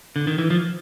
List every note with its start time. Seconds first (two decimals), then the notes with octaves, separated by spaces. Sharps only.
0.16 D3
0.27 D#3
0.38 E3
0.50 F3